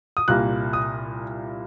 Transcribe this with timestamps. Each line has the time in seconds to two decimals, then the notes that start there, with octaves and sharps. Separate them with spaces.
0.17 D#6
0.28 C2 A#2 G3 A#3 F#6
0.73 D#6